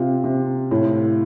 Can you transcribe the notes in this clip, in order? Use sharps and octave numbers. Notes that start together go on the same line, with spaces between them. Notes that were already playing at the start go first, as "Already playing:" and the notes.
Already playing: C3 F4
C3
A2